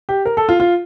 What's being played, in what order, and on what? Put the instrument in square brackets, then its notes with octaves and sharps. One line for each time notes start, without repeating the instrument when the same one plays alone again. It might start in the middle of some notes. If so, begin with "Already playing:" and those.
[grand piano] G4
A#4
A4
F4
F4